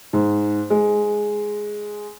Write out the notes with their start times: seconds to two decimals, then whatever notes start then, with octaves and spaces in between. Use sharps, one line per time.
0.13 G#2
0.70 G#3